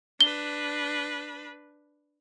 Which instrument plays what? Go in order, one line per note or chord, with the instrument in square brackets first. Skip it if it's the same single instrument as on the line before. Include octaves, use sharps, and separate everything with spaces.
[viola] D4 B4 [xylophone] G7